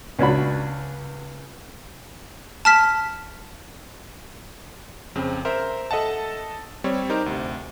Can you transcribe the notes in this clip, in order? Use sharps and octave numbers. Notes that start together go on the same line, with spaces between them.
C#2 C#4 D4 F#4 F#5 B5
A5 F6 B6
F2 C#3 C4
A#4 C5 E5
A4 D#5 E5 F#5 A5
G3 C4 C#5
D#4 G4 A#4 C5
D2 C3